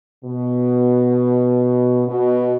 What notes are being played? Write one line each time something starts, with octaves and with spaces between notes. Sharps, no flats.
B2
B2